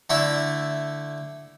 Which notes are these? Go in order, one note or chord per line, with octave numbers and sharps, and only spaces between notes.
D3 A3 E4 E5